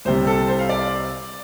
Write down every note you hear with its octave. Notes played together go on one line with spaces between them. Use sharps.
C2 C3 G3 C5
A4
C5
F5
D5